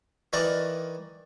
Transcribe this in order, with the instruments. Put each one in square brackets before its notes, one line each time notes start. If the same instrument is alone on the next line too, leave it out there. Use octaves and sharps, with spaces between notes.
[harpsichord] D#3 E3 D#4 A#4 D5